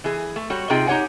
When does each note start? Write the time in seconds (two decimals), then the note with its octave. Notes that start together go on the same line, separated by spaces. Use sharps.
0.04 E3 G#4
0.36 A3
0.50 G3 F#4 C#5
0.70 C3 D#4 F4 G#4 G5
0.87 D#4 G4 C#5 F#5 G#5